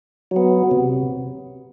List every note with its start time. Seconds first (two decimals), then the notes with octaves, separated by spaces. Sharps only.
0.31 F#3
0.36 B3
0.71 C3